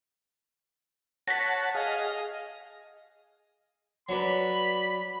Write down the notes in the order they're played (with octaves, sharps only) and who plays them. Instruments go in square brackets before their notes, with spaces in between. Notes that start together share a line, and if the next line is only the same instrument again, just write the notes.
[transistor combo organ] C#5 F#5 A5 [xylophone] A#6 B6
[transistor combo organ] G#4 F5 [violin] D#5
[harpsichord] F#3 D4 B4 [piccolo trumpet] B5